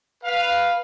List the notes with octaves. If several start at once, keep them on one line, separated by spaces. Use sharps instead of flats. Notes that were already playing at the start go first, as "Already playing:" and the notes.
B4 F5